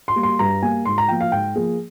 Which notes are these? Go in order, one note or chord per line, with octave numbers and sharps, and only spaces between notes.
C6
G3 A#3
C6
G2 A#5
G3 A#3 G#5
G#2 C6
A#5
F3 A#3 G5
F5
G#2 G5
F3 A#3 G#4